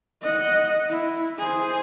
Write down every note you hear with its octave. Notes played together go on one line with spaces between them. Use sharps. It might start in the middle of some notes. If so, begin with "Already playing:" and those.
D#5 F#5
E4
G#4 C5